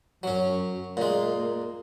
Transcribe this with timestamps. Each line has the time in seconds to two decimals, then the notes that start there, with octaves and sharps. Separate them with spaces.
0.23 F#2 F#3 C#4
0.97 A#2 G#3 A#3